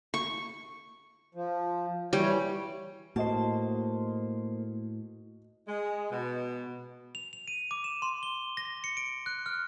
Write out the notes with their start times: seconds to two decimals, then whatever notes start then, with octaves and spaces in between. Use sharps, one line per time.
0.14 C#6
1.35 F3
2.13 E3 G3 C#5
3.16 A2 A#3 F#4 C5 D#5 A5
5.68 G#3
6.11 B2
7.15 F7
7.33 F7
7.48 D#7
7.71 D6
7.84 E7
8.02 C6
8.23 G7
8.57 A#6
8.84 C#7
8.97 D7
9.26 F#6
9.46 F6